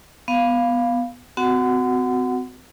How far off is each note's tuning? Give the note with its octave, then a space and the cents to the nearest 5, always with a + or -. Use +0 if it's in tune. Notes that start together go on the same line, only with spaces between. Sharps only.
B3 +0 F5 +0
C4 -40 F#4 +0 F#5 +0